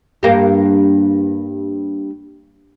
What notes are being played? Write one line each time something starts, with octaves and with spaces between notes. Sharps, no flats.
G2 A#3 G4